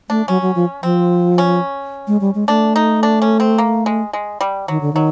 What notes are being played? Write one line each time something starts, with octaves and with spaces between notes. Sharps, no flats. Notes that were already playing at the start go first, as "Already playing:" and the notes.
A3 D4
F#3 C#4
F#3
F3
F3 C4
C#4
G#3
G3
G#3
A3 D4
D#4
D4
C#4
C4
A#3
G#3
G#3
G3
D#3 F#3
D3
D#3 F#3